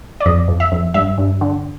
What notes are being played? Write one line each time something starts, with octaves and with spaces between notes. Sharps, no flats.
D5
F2 D#5
F2
E5
F2
G2 E5
G2
D3